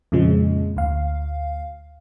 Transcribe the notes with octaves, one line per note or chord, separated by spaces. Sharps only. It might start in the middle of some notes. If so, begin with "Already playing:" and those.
F2 A#2 C#3 F3 G#3
D2 F5